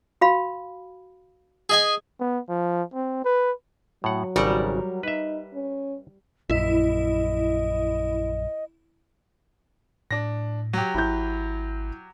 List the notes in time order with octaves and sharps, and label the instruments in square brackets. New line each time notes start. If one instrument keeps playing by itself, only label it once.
[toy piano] F#4 F5 B5
[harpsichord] G#4 D#5 G#5
[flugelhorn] B3
F3
C4
B4
[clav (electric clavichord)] A2 F#5 [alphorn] F#3
[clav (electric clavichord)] G#1 C#3 D5 [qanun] G3 A#4 F#5
[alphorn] D#4 [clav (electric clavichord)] B4 E5
[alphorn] C#4
[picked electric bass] A#1 F#2 [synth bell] E4 [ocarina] D#5
[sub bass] A2 [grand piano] D4 A#6
[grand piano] F#3 G4
[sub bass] G#1 [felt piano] E4 G6